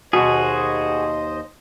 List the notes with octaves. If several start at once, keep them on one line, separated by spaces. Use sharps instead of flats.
D#2 B2 F#4 G#4 C5 D#5